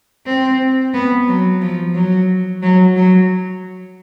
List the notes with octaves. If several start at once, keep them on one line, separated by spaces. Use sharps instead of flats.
C4
B3
F#3
F3
F#3
F#3
F#3